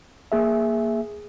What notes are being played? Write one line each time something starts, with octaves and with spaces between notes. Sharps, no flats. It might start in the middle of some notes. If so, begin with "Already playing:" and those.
A#3 G#4 E5